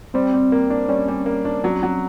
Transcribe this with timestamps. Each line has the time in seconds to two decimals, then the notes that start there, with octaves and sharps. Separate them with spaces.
0.14 G3 C4
0.34 G3
0.52 A#3
0.70 D4
0.88 G3 C#4
1.08 G3
1.26 A#3
1.45 D4
1.64 F#3
1.83 F#3